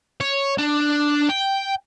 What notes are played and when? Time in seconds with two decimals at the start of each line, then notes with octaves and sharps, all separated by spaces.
0.21 C#5
0.58 D4
1.30 G5